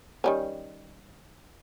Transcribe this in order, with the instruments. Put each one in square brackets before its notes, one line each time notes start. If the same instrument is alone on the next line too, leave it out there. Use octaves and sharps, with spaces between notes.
[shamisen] D#3 G3 C#4